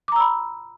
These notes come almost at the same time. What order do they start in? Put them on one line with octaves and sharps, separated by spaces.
D6 A#5 E6 B5